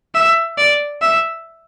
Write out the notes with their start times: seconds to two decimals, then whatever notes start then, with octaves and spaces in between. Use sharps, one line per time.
0.15 E5
0.58 D5
1.02 E5